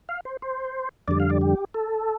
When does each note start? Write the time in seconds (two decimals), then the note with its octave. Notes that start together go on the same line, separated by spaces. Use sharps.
0.09 F5
0.25 C5
0.42 C5
1.08 F2 D3 G3 D5
1.20 F5
1.30 D5
1.41 G4
1.74 A4